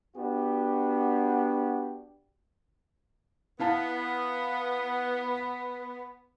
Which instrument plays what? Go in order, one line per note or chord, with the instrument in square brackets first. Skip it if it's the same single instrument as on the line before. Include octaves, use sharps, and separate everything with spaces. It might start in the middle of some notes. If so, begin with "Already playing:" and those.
[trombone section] B3 D4 F#4 G4
[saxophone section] B3 [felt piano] E4 F5 A5